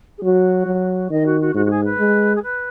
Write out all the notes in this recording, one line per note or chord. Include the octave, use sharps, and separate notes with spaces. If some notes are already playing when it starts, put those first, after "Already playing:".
G#4
F#3 F#4
F#3
D#3 D#5
F#4
F#4
G#2 F#4
F#4
G#4
B4
G#3
G#4
B4